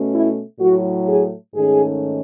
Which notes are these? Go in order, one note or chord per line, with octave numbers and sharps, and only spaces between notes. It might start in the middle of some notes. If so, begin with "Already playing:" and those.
Already playing: B2 A3 C#4
E4
A2 F#3 A3 F#4
G#4
G#2 D#3 A3 C#4 G#4